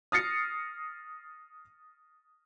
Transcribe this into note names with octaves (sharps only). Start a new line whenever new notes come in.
D#6 F6 A6 A#6 C7 C#7